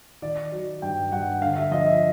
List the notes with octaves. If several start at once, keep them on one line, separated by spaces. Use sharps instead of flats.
D#3 D5
F#3
G2 G5
G2 F#5
D3 F5
E5
F3 D#5
E5